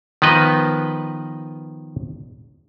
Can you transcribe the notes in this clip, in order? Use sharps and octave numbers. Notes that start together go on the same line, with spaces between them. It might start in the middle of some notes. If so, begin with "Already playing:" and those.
D#3 F3 B3 B4 D#5